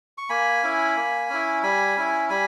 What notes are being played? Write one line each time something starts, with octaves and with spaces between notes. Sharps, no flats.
C#6
A#3 G#5 B5
C#4 E4
A#3
C#4 E4
G3 G#5 B5
C#4 E4
G3 G#5 B5